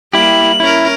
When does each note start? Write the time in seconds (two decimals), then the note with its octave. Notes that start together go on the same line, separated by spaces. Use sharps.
0.13 G3 A#3 E4 G4 F#7
0.60 C#4 E4 A#4